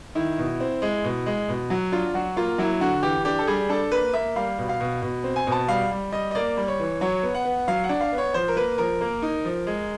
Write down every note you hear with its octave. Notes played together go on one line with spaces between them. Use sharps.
D#3 E4
B2
C4
G#3
B2
G#3
B2
F#3
D4 F4
F#3 F#4
A#3 F4
F#3 E4
D3 F#4
E3 G4
D4 G4
A4
G3 G#4
D4 A4
A#3 B4
A#3 E5
G3 F5
B2
F5
B2
B2
C4
G#5
B2 A5
G3 F5
G3
G3 D#5
D#5
A#3 D5
G3
C#5
E3
F#3 C#5
B3
F#5
B3
F#3 F5
F#5
D4
F5
B3
C#5
F3 C5
A#4
A#3 B4
F3 A#4
A#3
D#4
F3
G#3